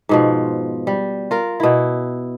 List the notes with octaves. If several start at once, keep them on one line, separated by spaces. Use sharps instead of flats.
G#2 B2 F3
G3
F4 A#4
B2 E4